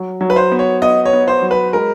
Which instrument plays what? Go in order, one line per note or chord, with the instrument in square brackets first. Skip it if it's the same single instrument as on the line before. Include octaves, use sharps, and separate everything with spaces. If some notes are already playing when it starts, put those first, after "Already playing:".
Already playing: [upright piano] F#3
F#3
[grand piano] B4
C5
[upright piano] B3
[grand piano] C#5
[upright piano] B3 [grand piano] D#5
[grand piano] C#5
[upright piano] B3
[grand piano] C5
[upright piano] F#3
[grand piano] B4
[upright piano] G#3 [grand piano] A#4